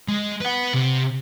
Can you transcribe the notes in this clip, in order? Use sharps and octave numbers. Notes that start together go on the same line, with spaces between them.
G#3
B4 F#5
C3